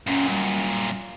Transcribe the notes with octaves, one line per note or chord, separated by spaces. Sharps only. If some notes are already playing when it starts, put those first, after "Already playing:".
F#2 A#2 C#4
G3